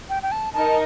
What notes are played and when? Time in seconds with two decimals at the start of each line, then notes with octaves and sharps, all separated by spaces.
0.09 G5
0.23 G5
0.32 A5
0.53 D#4 A#4 A5